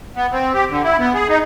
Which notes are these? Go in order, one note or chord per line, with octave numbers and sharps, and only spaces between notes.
B3
C4
G4
D3
E4
B3
G#4
D#4